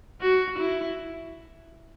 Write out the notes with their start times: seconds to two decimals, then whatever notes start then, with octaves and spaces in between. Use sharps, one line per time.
0.21 F#4
0.59 E4